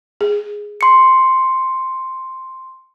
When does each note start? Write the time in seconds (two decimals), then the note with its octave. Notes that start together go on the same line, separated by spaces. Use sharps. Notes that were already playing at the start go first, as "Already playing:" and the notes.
0.21 G#4
0.81 C6 C#7